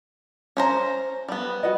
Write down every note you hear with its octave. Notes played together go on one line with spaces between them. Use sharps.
C#4 C5 A#5
G3 B3
F#4 B4 D#5